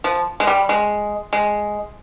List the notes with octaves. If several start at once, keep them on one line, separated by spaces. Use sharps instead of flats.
F3
G#3
G3
G#3
G#3